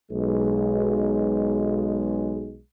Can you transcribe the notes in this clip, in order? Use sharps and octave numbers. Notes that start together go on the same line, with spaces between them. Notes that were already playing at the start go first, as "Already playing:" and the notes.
B1 G#3